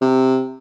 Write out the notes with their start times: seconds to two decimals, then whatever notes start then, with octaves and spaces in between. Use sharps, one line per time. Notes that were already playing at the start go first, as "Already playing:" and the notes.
0.01 C3